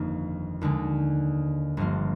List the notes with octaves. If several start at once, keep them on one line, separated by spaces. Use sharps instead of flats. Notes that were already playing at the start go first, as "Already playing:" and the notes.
Already playing: G1 F2 D#3 A#3
D#2 D3 G#3
G1 G2 D3 F3 A#3